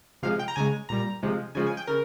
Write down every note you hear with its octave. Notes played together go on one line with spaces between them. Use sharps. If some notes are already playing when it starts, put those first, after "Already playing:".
C3 F3 G#3 F5
G5
A#5
C#3 G#3 G#5
A#2 G3 A#5
C3 F3 G#3
C#3 F3 G#3 G#5
G#5
G5
C#3 A#4